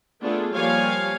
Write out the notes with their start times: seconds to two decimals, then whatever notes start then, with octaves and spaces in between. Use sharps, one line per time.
0.22 A3 B3 D4 F4 G#4 A4
0.55 F3 G3 A#3 C#5 F5 G#5